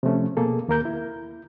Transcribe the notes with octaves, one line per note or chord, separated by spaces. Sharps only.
C3 F3 A3 C#4
B2 A#3 G#4 A4
D#2 A#3 A#4 G6
E4